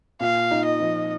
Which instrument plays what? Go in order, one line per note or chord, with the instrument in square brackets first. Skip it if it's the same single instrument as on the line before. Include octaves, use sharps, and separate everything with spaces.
[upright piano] A#2 [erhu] F5
[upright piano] D#4
[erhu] D#5
[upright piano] F3